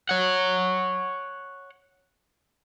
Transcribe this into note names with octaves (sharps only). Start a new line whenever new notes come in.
C#5 F#5